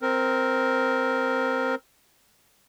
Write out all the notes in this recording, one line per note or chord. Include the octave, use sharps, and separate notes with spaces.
C4 A#4